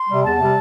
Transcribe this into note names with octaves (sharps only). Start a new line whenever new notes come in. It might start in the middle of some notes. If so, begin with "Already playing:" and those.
Already playing: C6
C3 G3
E2 A5
C3 G3